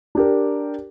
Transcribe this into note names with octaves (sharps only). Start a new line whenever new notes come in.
D4 G4 A#4